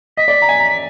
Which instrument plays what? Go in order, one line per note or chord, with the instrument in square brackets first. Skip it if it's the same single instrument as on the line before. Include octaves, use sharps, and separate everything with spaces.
[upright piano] D#5 [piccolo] B6
[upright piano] D5
A#5
G#5
A#5